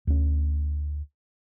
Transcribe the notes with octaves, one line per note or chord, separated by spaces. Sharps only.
D2 C#4